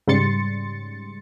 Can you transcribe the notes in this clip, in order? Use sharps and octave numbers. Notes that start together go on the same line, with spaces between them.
G#2 C#3 G3 C6 A6 C#7